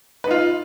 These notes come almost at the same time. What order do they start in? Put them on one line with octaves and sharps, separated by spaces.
B4 D#4 F4